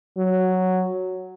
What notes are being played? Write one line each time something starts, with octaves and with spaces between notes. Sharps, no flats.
F#3